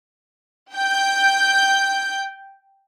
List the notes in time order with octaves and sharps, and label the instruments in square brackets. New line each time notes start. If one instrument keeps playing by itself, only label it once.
[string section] G5 G6